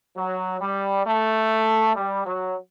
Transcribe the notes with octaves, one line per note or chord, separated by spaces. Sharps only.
F#3
G3
A3
G3
F#3